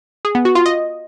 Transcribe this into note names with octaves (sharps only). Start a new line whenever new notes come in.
G#4
B3
F#4
F4
D#5